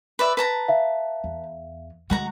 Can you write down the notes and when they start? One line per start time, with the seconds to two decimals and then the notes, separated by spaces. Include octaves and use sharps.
0.19 B4 D5 E5
0.37 B4 A5 A#5
0.68 E5 F5
1.24 E2
2.10 D3 G#3 F#4 F#5 A#5